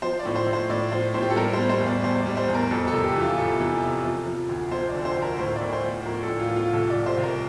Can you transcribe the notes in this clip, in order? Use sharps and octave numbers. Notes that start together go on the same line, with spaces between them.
F3 C5
D5
A2
C5
A2
C5
A2 D5
F3 C5
A2 C5
G4
A4
G3 A#4
C5
G3
C5
E2
D5
E2 C5
D5
G3
C5
E2
A#4
F2 A4
A4
C3
G4
E3
F4
C3 A4
E3
C3
F3
F3
D2
F3 C5
D5
D3
C5
D2
A#4
A2 C5
D5
A2
C5
F3
F3 A#4
A4
A2
F4
F3
F4
C2 A4
D5
C2
C5
C2
A#4